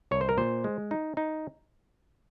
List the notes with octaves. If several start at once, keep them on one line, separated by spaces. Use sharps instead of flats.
C2 C#5
C5
A#4
A#2 C5
G#3
D#4
D#4